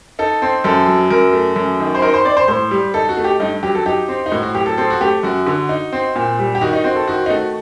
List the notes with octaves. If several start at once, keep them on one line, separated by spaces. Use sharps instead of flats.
D#4 A4
C4
F#2 A4
F#3
F#2 A#4
A3
F#2
D#3
C5
D#4 A#4
C5
C4 D5
C5
A2 C5
G3
D#4 A4
F#4
A3
G4
G2 D#4
F#3 G4
A4
D#4 G4
C4
D#4
A2 F#4
F#4
F#3 G4
A4
C4 A4
F#4
A3 G4
F#2 F#4
D3
D#4
C4
A#2
G3
G4
D#3 F#4
D#4
C4 F#4
A4
D#3 F#4
D#4
A3 F#4